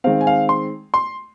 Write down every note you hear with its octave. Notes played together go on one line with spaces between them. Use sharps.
D#3 G#3 C4 F5
G#5
F5
C6
C6